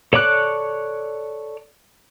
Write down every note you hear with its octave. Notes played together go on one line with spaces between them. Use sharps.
A4 C#5 D5 D6 F#6